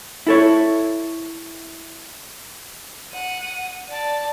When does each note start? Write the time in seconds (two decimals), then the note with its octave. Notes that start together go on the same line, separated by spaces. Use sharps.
0.27 E4 A4 C#5
3.13 F#5 D#7
3.89 D5 A5